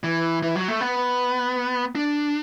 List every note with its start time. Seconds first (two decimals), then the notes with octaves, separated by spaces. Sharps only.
0.04 E3
0.42 E3
0.56 F#3
0.68 A3
0.81 B3
1.95 D4